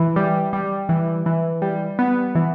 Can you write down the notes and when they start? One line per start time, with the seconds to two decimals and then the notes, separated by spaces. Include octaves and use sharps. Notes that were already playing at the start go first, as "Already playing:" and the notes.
Already playing: E3
0.16 G3
0.53 G3
0.89 E3
1.26 E3
1.62 G3
1.99 B3
2.35 E3